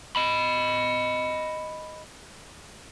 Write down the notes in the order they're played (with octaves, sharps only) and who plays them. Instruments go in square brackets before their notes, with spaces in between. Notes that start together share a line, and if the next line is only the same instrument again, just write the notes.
[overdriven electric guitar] D#5 B5